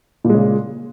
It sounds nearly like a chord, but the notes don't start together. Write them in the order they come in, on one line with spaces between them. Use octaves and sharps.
A#2 G#3 C#3